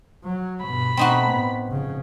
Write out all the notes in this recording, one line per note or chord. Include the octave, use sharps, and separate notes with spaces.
F#3
G2 B2 B5
B2 A3 C4 D#4 F#4
A2 B3
F1 C#3